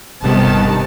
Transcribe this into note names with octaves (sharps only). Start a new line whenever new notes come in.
G1 C3 D#3 G3 B3 A5